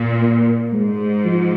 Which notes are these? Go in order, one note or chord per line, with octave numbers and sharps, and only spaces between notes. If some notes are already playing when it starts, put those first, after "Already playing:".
Already playing: A#2
A#3
G#2 G#3
F3